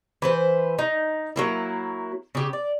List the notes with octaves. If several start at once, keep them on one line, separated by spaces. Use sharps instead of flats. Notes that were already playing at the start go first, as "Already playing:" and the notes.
E3 B4 C5
D#4
F#3 A#3 E4
C#3 G4
D5